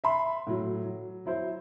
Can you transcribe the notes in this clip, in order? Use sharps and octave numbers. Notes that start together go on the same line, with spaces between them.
E5 B5 C6
A2 F#3
F#3
F#3 E4 C5